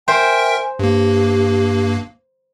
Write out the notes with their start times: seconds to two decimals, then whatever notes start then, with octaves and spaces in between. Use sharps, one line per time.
0.08 A#4 C5 E5 G5 G#5
0.79 G2 A#3 G4